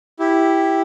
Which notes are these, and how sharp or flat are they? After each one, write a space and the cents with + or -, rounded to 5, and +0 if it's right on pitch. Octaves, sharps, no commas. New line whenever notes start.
E4 +0 G4 +0